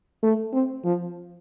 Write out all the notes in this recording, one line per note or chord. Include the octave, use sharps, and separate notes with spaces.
A3
C4
F3